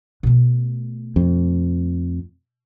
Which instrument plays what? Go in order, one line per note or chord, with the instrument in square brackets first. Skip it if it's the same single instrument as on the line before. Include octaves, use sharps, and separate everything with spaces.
[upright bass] B2 A3
[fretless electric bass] F2